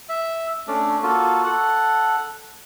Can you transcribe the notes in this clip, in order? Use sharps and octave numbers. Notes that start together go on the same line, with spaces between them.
E5
A3 C#4 D4 D5
A#3 F4 F#4 A4
A4 F#5